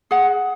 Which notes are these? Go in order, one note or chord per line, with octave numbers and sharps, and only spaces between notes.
G#4 F#5